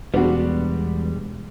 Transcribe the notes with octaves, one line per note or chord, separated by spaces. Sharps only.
E1 G3 G#3 B3 D4 F#4